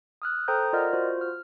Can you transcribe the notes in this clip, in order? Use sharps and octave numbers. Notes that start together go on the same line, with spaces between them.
D#6 F6 F#6
A4 C5 G5 A#5 D#6 G6
F4 A#4 D5 D#5 F#5 F6
F4 F#4 C5
F6